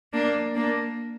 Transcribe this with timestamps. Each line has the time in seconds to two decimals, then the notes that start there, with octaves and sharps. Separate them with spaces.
0.13 A#3 D4
0.56 A#3 D4